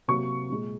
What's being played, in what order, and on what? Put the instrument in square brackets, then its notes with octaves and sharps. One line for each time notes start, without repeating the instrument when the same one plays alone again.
[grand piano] C3 F#3 A#3 C#6
A#2 G#3